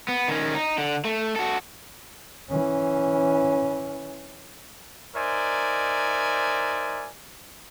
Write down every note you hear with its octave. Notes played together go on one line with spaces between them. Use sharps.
B3
D#3 C#4
D#4
D3
A3
F#4 A4
E3 C#4
D#4 A#4 C5 D5 E5 G#5